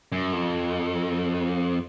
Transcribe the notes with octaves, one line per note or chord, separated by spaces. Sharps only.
F#2
F2